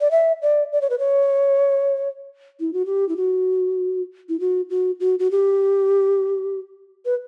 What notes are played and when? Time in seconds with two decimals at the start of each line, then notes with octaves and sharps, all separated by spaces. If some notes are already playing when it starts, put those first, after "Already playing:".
0.01 D5
0.11 E5
0.42 D5
0.72 D5
0.81 C#5
0.90 B4
0.99 C#5
2.60 E4
2.73 F#4
2.86 G4
3.09 E4
3.17 F#4
4.29 E4
4.40 F#4
4.70 F#4
5.00 F#4
5.19 F#4
5.31 G4
7.05 B4